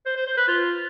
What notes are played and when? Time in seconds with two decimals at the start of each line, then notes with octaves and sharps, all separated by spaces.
0.06 C5
0.16 C5
0.27 C5
0.37 B4
0.48 F4